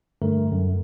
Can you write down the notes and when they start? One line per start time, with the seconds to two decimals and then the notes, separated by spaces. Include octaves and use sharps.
0.22 G2 D3 A3 A#4
0.52 F#2